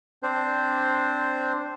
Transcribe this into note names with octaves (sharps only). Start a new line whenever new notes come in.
C4 D4 C5